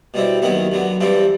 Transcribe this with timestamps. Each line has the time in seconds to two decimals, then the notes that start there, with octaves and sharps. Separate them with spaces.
0.14 B2 G3 C4 E4
0.42 D#2 D#3 F#3 B3 E4
0.72 D3 F#3 B3
1.01 G2 E3 G3 C4 E4